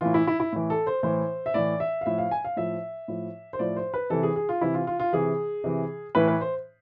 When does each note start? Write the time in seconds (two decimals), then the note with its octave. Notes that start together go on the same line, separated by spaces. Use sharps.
0.01 A2 E3 F4
0.14 E4
0.27 E4
0.40 E4
0.53 A2 E3
0.70 A4
0.87 C5
1.03 A2 E3 C5
1.46 E5
1.54 A2 E3 D5
1.80 E5
2.01 F5
2.06 A2 F3 E5
2.18 F5
2.31 G#5
2.45 F5
2.56 A2 F3 E5
3.08 A2 F3
3.53 C5
3.59 A2 F3 D5
3.77 C5
3.94 B4
4.10 C3 E3 A4
4.23 G#4
4.36 G#4
4.49 F4
4.61 C3 E3 E4
4.74 F4
4.87 F4
5.00 F4
5.13 C3 E3 G#4
5.64 C3 E3
6.15 A2 E3 B4
6.28 B4
6.41 C5